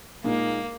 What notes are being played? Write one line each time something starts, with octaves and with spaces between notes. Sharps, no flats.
A#2 G#3 A#3 D#4